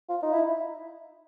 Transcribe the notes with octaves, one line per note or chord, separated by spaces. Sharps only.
F4
D#4
E4